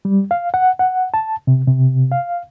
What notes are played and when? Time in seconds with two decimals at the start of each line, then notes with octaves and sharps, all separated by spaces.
0.05 G3
0.31 F5
0.54 F#5
0.79 F#5
1.14 A5
1.47 C3
1.68 C3
2.12 F5